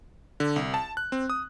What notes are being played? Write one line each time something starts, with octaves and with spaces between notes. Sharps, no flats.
D3
C2
A5
F#6
C4
D#6